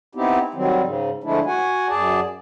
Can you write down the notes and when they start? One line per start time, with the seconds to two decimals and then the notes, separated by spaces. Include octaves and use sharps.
0.15 B3 C4 D#4 E4 G4
0.54 D#3 F#3 G3 C4
0.82 G#2 C#3
1.24 D3 F3 G#3 A3 D4 E4
1.46 F#4 F#5 G#5
1.89 F#2 G#4 D5 A5